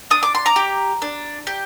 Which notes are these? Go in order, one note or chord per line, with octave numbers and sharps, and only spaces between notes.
D4 D#6
D6
C6
A#5 D6
G4
D4
G4